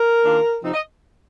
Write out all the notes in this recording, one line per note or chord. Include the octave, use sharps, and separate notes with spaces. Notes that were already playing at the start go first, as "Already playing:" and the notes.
Already playing: A#4
D#3 A#3 D4 F4
C3 F3 C4 D#4
D#5